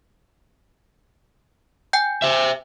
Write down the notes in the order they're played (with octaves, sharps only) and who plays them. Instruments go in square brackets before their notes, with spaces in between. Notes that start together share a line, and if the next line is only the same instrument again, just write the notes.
[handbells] G5 G#5 G6
[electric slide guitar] C5 E5